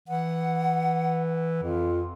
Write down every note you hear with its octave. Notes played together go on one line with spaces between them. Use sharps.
E3 F#5
F2 F4